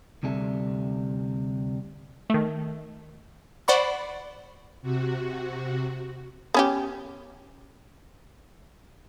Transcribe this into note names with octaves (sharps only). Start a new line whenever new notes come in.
D2 C3 G3 A4 E5
D#3 A3
C5 D5 F#5 B5 C#6
C3 F#4
B3 C#4 G4